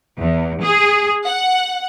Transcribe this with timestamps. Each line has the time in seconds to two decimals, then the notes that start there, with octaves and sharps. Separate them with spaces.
0.18 E2
0.62 G#4
1.25 F#5